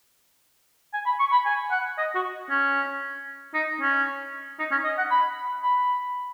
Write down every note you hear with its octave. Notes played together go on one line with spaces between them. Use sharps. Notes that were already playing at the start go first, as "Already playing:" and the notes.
G#5
B5
C#6
B5
G#5
F#5
D#5
F#4
C#4
D#4
C#4
D#4
C#4
D#5
F#5
B5
B5